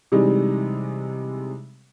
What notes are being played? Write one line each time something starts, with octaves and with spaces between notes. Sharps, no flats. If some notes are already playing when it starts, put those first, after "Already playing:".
C3 E3 G3 G#3 D#4